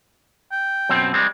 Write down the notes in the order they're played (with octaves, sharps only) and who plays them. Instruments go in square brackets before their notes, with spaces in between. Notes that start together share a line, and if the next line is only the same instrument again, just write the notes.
[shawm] G5
[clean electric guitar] F#2 B2 C4
G3 G#3 C4